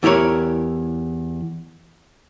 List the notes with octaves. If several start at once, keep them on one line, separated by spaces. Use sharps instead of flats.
E2 E4 G4 A#4 C#5